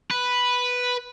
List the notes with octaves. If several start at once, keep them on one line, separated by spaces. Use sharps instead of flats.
B4